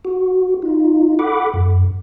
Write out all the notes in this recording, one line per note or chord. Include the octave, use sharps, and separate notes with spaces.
F#4
D#4 F4
A4 F#5 B5 D6
F#2